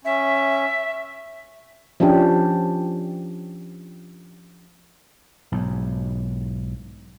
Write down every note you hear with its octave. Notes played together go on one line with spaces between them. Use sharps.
C#4 E5
F3 C#4 D4 G4
B1 G#2